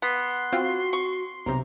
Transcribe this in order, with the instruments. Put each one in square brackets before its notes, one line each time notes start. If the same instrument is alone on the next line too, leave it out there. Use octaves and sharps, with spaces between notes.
[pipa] B3 [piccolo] C6
[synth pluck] C4 F4 [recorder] F#4
[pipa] C#6
[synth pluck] B1 C3 [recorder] A#5